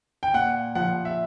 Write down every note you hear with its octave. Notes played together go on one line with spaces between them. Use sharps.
G5
A#2 F#5
F3 F#5
E5